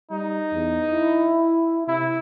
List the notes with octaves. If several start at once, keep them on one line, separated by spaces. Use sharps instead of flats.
G3 D#4
E2
E4
C3 E4